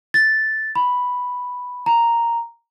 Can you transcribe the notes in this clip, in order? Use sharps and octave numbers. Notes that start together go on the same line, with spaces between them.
A6
B5
A#5